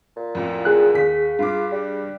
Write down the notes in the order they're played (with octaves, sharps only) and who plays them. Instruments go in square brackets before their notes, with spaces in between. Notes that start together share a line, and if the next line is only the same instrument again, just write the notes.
[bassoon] A#2
[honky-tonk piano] A1 F2
[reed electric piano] G#4 F#6
[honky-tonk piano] D#2 B6
[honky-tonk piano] G2 D6 [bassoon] F4
[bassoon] G3